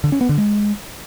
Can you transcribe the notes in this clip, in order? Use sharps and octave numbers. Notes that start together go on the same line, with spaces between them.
D3
C#4
B3
D3
G#3